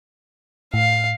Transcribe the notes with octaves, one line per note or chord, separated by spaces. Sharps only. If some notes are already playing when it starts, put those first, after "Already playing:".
A2 F5